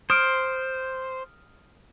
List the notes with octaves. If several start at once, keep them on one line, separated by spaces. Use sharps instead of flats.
C5 D#6 F6 D7